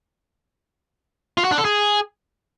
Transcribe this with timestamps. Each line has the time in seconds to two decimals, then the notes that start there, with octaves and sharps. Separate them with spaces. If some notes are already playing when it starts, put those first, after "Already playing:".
1.37 F4
1.44 F#4
1.51 D4
1.58 A4
1.65 G#4